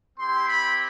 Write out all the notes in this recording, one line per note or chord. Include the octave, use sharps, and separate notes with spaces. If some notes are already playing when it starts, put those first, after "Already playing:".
C4 E4 G4 C6
B5